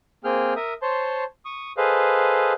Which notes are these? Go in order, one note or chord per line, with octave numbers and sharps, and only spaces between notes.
A#3 C4 G#4 G5 F6
A#4 E5 D#6
C5 C#5 A5 C6
C#6 D#6
G#4 A4 B4 C5 D#5 F5